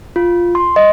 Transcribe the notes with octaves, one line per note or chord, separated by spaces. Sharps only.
F4
C6
D#5